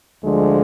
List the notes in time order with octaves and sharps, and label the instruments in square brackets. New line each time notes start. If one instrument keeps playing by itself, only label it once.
[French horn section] D2 D3 F3 G#3